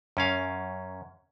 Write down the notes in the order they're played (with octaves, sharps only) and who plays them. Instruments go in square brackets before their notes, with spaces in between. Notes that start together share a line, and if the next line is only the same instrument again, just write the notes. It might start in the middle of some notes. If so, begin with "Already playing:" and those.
[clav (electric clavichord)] F#2 C#4 F5